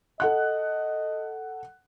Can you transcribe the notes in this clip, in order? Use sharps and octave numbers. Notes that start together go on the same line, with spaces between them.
A4 D#5 F#5 F#6